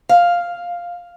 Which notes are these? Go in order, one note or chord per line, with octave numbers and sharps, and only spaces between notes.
F5